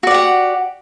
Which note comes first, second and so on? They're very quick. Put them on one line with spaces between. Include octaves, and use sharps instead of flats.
F#4 D5 G4 F#5